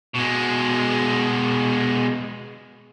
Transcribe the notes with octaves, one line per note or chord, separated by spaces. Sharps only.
B2 G#3